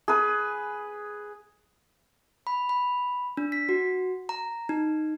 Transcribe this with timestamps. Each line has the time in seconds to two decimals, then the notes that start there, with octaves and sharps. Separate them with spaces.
0.08 G#4 B4
2.47 B5
2.69 B5
3.37 D4
3.52 B6
3.69 F#4
4.29 A#5
4.69 D#4